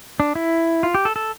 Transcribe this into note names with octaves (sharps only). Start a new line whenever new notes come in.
D4
E4
F4
G4
A4
A4